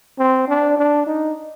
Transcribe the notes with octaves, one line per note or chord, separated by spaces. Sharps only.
C4
D4
D4
D#4